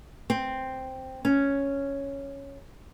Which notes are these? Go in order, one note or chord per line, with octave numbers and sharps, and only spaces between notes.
C4
C#4